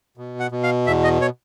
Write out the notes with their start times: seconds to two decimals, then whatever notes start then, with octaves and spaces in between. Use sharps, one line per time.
0.18 B2
0.40 F#5
0.52 B2
0.63 F5
0.87 E2 E5
1.04 D#5
1.22 C#5